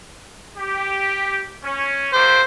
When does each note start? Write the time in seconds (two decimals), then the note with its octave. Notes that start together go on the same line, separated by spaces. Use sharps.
0.57 G4
1.62 C#4
2.13 A3 A#3 G4 C5